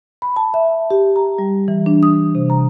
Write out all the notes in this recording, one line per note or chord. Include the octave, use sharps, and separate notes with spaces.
B5
A5
E5
G4
A#5
G3
E3
D4
D#6
C3
A#5